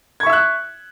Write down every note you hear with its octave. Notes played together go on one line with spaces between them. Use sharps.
E5 C#6 E6 F#6 G#6